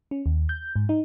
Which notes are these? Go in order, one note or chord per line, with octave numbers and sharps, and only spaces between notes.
C#4
D#2
G6
G#2
D#4